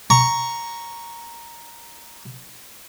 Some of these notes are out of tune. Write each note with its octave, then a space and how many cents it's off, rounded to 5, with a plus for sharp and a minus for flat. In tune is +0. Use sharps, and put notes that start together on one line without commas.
A#5 +0 C#6 +0